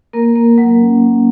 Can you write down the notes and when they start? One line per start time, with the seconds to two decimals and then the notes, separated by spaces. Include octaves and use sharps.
0.13 A#3 A#4
0.36 A#3
0.58 F#3
0.81 C#4